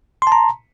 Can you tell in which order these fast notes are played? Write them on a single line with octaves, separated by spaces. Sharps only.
C6 A5 A#5